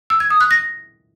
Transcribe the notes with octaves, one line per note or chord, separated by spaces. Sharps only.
E6
G#6
D#6
F#6
A#6